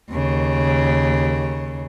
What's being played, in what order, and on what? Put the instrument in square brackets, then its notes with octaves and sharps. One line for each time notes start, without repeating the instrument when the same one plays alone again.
[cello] D#2 C#3